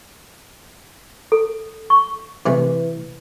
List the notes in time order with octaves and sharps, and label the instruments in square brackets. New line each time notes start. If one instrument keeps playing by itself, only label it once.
[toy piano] A4
C#6
[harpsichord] C3 G#3 A3 [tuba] E3